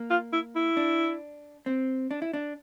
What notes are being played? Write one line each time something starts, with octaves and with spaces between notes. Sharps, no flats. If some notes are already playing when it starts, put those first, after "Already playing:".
Already playing: A#3
F4
E4
E4
D4
C4
D4
E4
D4